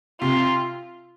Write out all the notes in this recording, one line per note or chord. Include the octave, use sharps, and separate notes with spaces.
C3 F4